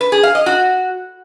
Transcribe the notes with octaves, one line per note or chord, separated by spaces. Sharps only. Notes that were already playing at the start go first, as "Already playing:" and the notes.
B4
G#4
F5
D#5
F#4